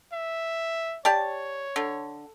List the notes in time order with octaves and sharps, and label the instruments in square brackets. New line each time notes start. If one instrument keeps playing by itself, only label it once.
[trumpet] E5
[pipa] G4 D5 A5 [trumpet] C#5
[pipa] D3